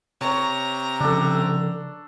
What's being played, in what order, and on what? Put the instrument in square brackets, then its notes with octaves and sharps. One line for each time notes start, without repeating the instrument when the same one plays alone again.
[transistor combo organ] C3 [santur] C#5 C#6 [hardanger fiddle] A#5
[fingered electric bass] C#3 F3 [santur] D4 A4